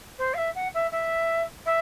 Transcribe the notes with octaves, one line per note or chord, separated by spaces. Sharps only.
C5
F5
E5
F#5
E5
E5
E5